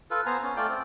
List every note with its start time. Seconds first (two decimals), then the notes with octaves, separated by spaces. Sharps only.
0.11 F4 A4 B4
0.26 B3 C5 G#5 A#5
0.43 C#4
0.57 A3 F4 D5 G5
0.69 C4